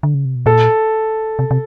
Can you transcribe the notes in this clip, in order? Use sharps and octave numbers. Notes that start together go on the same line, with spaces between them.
D3
C#3
C3
B2
A#2 A4
C3
C3